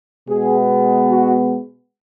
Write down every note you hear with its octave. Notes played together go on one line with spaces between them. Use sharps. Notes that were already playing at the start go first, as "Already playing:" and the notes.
B2 G#3 B3 G#4
F#4